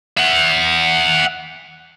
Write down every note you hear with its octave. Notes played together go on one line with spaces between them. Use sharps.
E5 F#5